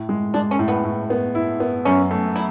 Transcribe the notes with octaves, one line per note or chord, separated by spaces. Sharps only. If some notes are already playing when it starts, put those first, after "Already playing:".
Already playing: A2
G#3
G#3 D4
C#4
A2
B3
A2
B3
E4
B3
F#2 C#4
A3
E4